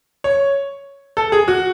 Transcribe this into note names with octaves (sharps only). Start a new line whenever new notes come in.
C#5
A4
G#4
F#4